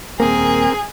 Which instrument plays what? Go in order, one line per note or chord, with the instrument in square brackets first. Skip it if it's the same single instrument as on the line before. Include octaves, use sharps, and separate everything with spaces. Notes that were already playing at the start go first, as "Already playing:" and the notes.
[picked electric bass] D#1 A#3 [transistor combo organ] C4 A#4 [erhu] G#4